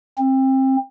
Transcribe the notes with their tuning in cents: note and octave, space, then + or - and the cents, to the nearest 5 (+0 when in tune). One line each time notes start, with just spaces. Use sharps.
C4 +25